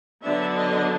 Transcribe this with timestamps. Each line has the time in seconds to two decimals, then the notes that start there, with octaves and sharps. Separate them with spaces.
0.23 D3 F#3 B3 D4 E5
0.56 D#5